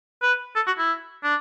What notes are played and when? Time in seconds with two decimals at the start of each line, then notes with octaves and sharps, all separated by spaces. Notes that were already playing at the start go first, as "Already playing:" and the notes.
0.22 B4
0.56 A4
0.67 F#4
0.78 E4
1.24 D4